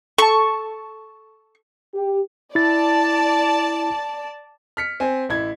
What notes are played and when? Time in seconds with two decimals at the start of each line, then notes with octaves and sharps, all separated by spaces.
0.18 A4 A5 C#6
1.94 G4
2.55 E4 D5 A5 A6
4.77 F6 B6 C#7
5.00 C4 G#5
5.29 A1 E4 G#6